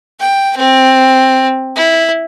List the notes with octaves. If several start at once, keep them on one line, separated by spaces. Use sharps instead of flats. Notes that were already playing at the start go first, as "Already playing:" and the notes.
G5
C4
E4